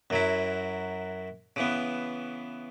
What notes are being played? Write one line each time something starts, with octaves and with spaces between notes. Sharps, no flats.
F#2 F#3 E4
C#3 E3 B3